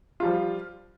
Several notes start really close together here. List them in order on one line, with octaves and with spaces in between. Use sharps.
F4 G3 F3